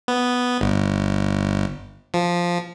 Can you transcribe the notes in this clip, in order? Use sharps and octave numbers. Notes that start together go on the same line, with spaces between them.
B3
G1
F3